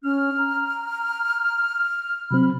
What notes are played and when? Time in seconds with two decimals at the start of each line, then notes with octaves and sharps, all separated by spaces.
0.03 C#4 F6
0.38 A#5
2.31 C3 F#3 C4 B5